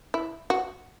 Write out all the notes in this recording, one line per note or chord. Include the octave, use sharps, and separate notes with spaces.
E4
F#4